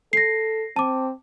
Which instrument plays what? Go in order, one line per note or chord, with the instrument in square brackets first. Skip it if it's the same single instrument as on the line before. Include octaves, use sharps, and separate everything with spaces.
[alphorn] A4 [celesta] A#6 C7
[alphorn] C4 [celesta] A5 D6